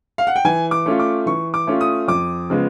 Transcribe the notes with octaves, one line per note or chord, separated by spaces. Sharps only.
F5
F#5
G5
E3 G#5
D6
A3 C#4 F4
D6
E3 C#6
D6
A3 C#4 F4
D#6
F2 D6
C#3 F3 G#3 B3